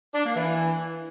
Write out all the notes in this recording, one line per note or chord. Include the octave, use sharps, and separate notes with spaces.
D4
A#3
E3